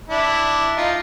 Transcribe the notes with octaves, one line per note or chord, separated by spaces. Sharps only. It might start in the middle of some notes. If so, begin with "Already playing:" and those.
D4 E4
D#4 F4